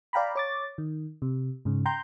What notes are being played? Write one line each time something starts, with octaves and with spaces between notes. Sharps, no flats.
D5 F5 G5 A#5 B5
C#5 D6 A6
D#3
C3
G#2 C#3
G5 A#5 C6 G6